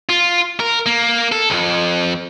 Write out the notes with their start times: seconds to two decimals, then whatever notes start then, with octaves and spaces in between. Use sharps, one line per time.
0.09 F4
0.60 A#4
0.86 A#3
1.32 A4
1.50 C2 F2